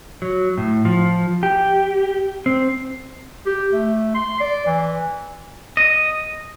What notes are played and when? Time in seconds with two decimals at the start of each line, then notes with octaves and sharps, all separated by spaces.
0.22 F#3
0.57 A2
0.85 F3
1.43 G4
2.46 C4
3.46 G4
3.72 A3
4.15 C6
4.40 D5
4.66 E3
5.77 D#5